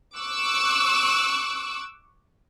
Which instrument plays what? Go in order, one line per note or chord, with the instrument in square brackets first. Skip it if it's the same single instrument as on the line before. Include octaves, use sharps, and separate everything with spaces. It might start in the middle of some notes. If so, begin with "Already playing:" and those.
[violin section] C#6 D6 E6 F#6